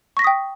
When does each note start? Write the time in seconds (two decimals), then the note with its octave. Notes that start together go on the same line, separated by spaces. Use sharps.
0.17 C#6
0.19 A#6
0.22 B6
0.24 D#6
0.27 G5